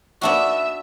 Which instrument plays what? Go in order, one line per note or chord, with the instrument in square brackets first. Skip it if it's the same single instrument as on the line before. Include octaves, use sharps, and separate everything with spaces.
[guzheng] B3 D4 F#4 [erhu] E5